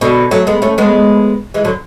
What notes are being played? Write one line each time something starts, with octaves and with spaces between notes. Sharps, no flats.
B2 D3
F#3 A3
G#3 B3
A3 C#4
G#3 B3
E3 G#3
D3 F#3